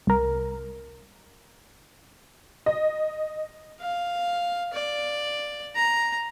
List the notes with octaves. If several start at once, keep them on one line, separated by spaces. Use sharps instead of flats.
C2 A#4
D#5
F5
D5
A#5